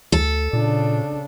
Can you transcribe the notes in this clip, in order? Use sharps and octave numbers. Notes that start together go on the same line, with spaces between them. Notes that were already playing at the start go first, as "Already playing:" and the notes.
D2 A4
A#2 C#3 D4